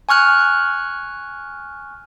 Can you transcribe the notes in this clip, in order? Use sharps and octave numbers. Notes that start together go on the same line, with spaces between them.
G#5 C#6 F6 F#6